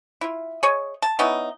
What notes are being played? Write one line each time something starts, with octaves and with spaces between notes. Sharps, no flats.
E4 F4
G#4 C#5 D#5
A5
B3 C#4 D#4 E4